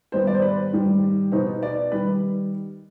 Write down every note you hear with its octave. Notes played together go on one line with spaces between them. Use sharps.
G#2 D#3 G3 B3 C5
D5
C5
B4
G#2 D#3 G3
B2 B3 D#4 C5
D5
D#3 G3 B4